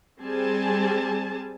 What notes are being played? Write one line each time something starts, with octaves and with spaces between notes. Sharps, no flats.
G3 C4 G#4 G#5 A5